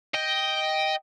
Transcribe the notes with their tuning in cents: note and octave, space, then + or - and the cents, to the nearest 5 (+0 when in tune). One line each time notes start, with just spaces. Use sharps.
D#5 +5 G5 +0